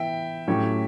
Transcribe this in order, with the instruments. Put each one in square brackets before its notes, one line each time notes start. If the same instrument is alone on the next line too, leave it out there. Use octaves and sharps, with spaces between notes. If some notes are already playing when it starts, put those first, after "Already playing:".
Already playing: [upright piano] E3 B3 E4 [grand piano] E5 G5
[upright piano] A2 F#3 C#4 G4 C#5